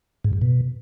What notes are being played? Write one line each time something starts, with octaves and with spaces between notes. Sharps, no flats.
G#2
G2
B2